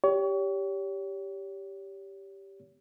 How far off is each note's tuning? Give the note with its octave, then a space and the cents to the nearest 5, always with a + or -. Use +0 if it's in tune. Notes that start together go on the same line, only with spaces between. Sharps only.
G4 +0 C#5 +35